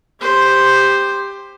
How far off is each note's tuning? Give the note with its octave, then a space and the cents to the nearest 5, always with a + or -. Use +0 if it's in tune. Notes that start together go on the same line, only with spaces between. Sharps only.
G4 +15 C5 +0